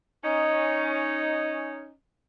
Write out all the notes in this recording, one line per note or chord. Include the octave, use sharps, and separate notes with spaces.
C#4 D#4